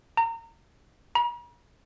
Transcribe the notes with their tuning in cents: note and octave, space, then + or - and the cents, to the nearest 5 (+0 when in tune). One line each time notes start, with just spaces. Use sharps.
A#5 -30
A#5 +45